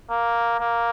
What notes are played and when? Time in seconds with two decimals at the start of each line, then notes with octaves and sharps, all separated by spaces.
0.10 A#3
0.59 A#3